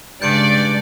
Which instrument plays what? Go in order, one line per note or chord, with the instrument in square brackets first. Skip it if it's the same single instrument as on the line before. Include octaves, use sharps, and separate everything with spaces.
[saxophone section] G2 [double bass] C#3 G#3 [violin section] D5 [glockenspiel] G6 C#7 D7